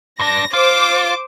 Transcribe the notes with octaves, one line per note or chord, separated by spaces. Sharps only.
G2 D4 A#6
F4 C5 D6